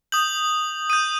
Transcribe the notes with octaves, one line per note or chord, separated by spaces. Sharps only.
D#6 G6 F#7
D#6 G6 D#7